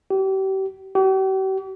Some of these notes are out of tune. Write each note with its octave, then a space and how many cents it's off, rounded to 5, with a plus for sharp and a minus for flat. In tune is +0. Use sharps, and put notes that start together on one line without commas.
G4 -35
G4 -45